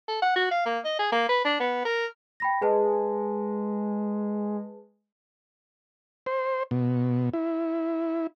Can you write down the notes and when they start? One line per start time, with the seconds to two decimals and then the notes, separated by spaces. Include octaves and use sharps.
0.08 A4
0.22 F#5
0.36 F#4
0.51 F5
0.66 A#3
0.84 D#5
0.99 G#4
1.12 A#3
1.29 B4
1.44 D4
1.60 B3
1.85 A#4
2.40 G5 B5 A#6
2.61 G#3 G#4 B4 A5
6.26 C5
6.71 B2
7.33 E4